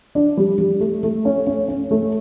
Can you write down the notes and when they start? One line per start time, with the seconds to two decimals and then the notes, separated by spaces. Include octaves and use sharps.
0.15 D4
0.37 G3
0.58 G3
0.80 A3
1.03 A3
1.25 C#4
1.47 C#4
1.68 C#4
1.91 A3